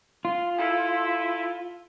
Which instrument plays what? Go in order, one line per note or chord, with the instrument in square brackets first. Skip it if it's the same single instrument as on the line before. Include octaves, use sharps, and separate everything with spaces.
[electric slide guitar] F4 [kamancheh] C6
[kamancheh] E4 A4